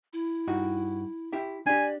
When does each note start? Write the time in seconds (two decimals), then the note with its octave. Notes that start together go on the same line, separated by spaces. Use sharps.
0.13 E4
0.47 G2 D#4 F#4
1.33 E4 G4 E5
1.67 D4 G4 D5 G#5